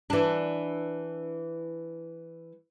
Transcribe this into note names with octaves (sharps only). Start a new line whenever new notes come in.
E3 D4